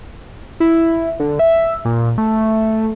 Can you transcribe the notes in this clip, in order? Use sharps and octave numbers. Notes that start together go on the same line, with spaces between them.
E4
D3
E5
A#2
A3